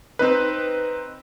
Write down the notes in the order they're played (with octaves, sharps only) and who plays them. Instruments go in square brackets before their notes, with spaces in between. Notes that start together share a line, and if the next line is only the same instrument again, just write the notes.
[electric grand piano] C4 D#4 B4